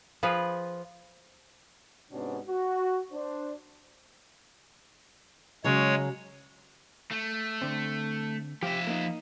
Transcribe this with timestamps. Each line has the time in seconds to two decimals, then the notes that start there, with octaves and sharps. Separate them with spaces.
0.23 F3 F4 G#4 B4
2.11 G#2 C3 B3 C#4 D4 F#4
2.46 F#4
3.12 D4 C5
5.64 C#3 F#3 G#3 C#5
7.11 A3
7.62 D3 C4
8.63 F3 G4 E5
8.87 A#3 D#4